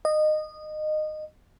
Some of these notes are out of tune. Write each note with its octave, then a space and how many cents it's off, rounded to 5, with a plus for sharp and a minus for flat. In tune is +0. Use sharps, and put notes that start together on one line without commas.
D#5 -20